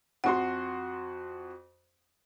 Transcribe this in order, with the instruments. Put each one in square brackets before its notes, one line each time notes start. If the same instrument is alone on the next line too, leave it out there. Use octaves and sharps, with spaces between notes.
[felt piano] F2 F#4 C6 [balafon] F#5